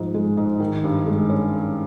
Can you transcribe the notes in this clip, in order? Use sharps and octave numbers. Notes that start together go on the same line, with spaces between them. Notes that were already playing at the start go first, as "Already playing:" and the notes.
Already playing: G#2 F3
G#3
G#2
D#3
G2
G#3
C#4